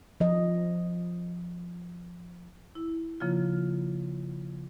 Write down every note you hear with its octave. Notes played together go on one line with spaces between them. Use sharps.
F3 D#5
E4
C#3 F3 A#3 F4